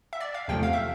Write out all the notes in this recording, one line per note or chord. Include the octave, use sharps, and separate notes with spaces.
E5
D5
F5
E2 C3 F3 A3 G5
F5
E5